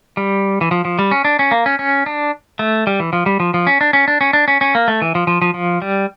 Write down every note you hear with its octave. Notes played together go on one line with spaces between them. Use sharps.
G3
E3
F3
F3
G3
C#4
D4
C#4
A#3
C#4
C#4
D4
A3
G3
E3
F3
G3
F3
F3
C#4
D4
C#4
D4
C#4
D4
C#4
C#4
A#3
A3
E3
F3
F3
F3
F3
G3